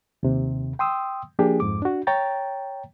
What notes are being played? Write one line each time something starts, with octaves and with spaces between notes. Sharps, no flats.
D#2 C3
G5 C6 D#6 E6
F3 A#3 D4 G4 G#4
F2 G#2 D6
D4 F#4
C#5 G5 A#5 A6